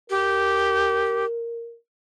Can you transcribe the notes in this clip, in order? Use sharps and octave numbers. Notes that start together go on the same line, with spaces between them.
G4 A#4